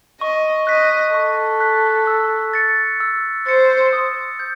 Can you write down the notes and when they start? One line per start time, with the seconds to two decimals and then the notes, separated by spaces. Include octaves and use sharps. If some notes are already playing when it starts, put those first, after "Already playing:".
0.21 D#5 C#6
0.67 D#5 F#6 B6
1.14 A4 C#6
1.60 F#6 B6
2.07 E6
2.53 A6 C#7
3.00 E6
3.47 C5 A6 C#7
3.93 D#6
4.39 G6